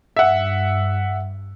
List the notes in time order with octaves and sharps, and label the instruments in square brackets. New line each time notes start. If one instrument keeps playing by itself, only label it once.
[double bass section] G2 [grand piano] E5 F#5